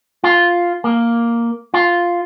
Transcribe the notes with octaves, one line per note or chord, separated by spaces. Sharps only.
F4
A#3
F4